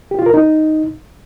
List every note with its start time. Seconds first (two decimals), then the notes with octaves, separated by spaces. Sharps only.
0.11 G4
0.19 F4
0.26 A#4
0.34 D#4